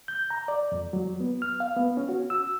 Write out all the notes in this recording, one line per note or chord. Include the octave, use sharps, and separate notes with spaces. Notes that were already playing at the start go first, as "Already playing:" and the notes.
G6
A#5
D5
F2
F#3
B3
F6
F5
B3
C#4
F#4
E6